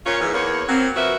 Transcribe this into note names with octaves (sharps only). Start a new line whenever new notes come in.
A#2 C#4 F4 C#5
G#2 E3
E2 A#3 B3 C#5
F#3 A#3 C4
A#2 F3 F#4 B4 E5